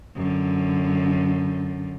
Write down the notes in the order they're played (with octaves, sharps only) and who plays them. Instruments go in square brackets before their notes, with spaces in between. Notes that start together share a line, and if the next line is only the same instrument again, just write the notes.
[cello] F#2 D3